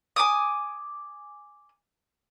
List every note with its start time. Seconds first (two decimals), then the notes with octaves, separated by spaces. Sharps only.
0.16 G#5 D6 D#6